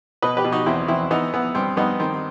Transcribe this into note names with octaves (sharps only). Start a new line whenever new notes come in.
B2 B4 D#5
G4 B4
B2
D#4 F#4
E2 C4 E4
E2 C4 E4
E3 B3 D#4
E3 B3
G2 C4
G2 B3 D#4
D#3 C4